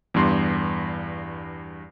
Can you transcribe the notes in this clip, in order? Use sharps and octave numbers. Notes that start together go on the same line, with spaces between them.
E2 G2 C6